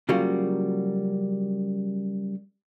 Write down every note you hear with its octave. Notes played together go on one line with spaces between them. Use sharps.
C#3 F#3 G3 A#3 F4 F#4